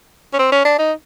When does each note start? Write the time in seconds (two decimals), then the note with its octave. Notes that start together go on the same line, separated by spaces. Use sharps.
0.34 C#4
0.39 C4
0.52 C#4
0.65 D4
0.79 D#4